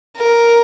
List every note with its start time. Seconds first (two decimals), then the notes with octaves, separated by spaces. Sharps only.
0.17 A#4